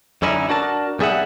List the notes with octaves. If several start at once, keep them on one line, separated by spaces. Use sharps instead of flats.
F#2 D3 C#4 D#4 E4
D4 F#4 A#4 A5
B1 G3 G#4 E5 F#5